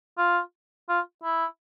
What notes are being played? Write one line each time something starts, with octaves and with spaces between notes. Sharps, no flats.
F4
F4
E4